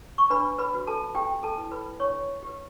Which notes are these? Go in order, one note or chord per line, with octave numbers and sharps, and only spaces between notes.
C#6
D4 B4 B5
B4 B5
F#4 B4
A4 A5
C#4 G4 G5
A4 A5
E4 B4
B4 B5
D4 C#5 C#6
G4 B4